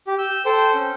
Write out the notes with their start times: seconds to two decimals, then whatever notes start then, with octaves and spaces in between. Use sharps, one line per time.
0.07 G4
0.19 E6 G6
0.46 A4 C5 G5
0.74 C#4